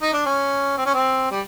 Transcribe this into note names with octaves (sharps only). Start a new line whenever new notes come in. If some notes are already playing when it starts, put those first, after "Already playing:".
D#4
D4
C#4
C4
C#4
C4
G3